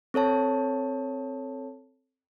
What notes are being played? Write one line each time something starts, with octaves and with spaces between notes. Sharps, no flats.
C4 A4 C#5 A5